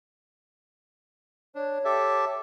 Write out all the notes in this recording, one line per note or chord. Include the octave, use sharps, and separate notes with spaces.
D4 C#5
G4 A4 E5